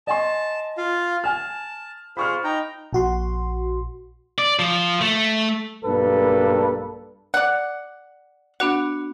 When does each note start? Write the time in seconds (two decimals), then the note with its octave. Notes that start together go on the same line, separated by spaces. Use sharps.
0.07 D#5 G#5 A5 C6
0.77 F4 F5
1.24 G#5 A5 F6
2.17 F4 G#4 C5 B5 C#6 F6
2.44 D#4 G5 A#5
2.93 A#1 F#4 C6
4.38 D5
4.59 F3
5.01 A3
5.84 B1 G2 A#3 A4 B4
7.34 D5 F#5
8.60 B3 D4 F#4 F#5